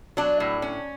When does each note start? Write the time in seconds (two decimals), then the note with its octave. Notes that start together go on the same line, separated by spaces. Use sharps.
0.17 F#3 D4
0.40 A2
0.62 C#4